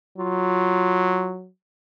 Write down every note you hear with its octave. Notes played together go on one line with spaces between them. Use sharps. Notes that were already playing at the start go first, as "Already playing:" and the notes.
F#3 F4